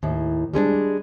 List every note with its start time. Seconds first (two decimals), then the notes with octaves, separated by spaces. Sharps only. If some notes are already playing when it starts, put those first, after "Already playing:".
0.03 D#2 A2
0.54 G3 G#3 C#4 D4